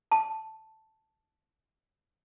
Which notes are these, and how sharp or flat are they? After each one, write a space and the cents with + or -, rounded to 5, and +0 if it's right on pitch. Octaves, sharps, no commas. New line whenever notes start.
A5 +0